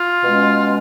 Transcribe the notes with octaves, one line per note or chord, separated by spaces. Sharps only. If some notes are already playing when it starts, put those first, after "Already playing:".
Already playing: F4
B2 G#3 C#4